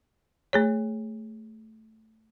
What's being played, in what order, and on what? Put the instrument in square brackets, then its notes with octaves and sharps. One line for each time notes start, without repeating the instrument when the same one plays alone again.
[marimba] A3 G#4 C#5